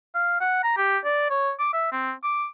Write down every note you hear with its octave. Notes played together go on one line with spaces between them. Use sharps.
F5
F#5
A#5
G4
D5
C#5
D6
E5
C4
D6